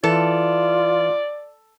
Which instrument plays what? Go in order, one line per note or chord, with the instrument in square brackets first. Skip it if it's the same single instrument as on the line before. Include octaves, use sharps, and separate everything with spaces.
[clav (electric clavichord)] E3 [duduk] F4 [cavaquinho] A4 [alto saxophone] D5